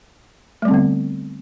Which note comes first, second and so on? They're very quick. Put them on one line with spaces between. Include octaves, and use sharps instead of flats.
A3 G3 C4 D3 B3